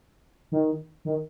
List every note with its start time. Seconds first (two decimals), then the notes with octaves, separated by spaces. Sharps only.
0.52 D#3
1.05 D#3